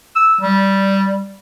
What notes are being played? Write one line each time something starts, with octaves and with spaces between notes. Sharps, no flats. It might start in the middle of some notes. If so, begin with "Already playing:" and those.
E6
G3